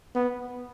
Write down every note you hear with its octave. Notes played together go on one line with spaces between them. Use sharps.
B3